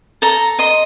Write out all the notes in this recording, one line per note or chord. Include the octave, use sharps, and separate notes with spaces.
A4 A#5
D#5 C6